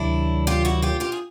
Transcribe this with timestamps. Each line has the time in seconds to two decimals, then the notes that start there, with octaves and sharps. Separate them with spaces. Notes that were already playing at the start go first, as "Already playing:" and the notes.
Already playing: D2 C3 D#3 F#3 D4 E4
0.47 F4 G4
0.65 E4 F#4
0.82 F4 G4
1.00 F4 G4
1.12 G#4